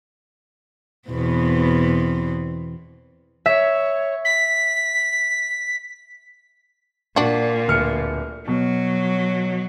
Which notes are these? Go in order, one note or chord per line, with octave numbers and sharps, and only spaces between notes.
E2 B2 C4
C#5 E5
B6
A#2 D4 F#4
D1 F6 C#7
B2 F#3